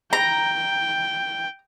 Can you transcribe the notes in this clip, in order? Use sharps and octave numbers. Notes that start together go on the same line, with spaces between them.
G5 A#5